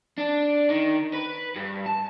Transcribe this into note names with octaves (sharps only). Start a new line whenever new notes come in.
D4
D#3
B4
G2
A5